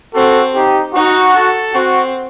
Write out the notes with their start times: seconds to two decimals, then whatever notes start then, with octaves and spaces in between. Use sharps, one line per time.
0.14 C4 F#4 A4
0.55 D#4 G4
0.95 D#4 F#4
1.35 A4
1.75 C4 F#4